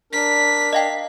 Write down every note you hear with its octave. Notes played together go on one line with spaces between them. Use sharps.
D4 A#4 B6
D#5 F5 G5